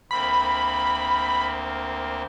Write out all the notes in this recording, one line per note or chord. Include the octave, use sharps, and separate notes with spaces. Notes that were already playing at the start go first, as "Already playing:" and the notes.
D2 A#3 C4 B5